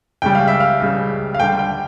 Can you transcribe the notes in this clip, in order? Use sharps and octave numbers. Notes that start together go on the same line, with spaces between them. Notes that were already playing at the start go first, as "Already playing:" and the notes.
C#2 C#3 G3 G5
F5
E5
F5
C#2 C#3 G3
F5
D2 D3 G3 G5
G5